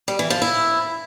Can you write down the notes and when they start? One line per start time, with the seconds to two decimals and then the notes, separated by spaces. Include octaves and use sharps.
0.08 G3
0.19 E3
0.30 F3
0.42 E4